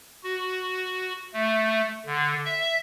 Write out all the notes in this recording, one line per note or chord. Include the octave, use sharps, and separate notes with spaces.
F#4
A3
D3
E5